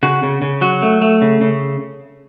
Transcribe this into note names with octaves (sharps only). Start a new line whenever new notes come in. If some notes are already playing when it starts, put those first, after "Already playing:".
C#3 F#4
C#3
C#3
F#3 F#4
A3
A3
C#3
C#3